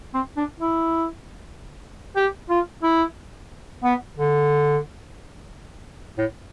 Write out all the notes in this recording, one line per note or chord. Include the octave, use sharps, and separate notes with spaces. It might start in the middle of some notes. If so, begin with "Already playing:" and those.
C4
D4
E4
G4
F4
E4
B3
D3
A2